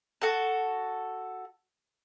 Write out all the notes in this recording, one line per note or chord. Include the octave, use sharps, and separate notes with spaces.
F#4 A4 A5